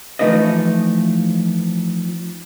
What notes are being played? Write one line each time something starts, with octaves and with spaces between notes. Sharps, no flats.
E3 F3 A3 D#4 B4 D#5